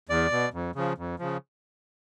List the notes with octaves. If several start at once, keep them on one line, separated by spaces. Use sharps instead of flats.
E2 D5
B2
F2
C#3 F3
F2
C#3 F3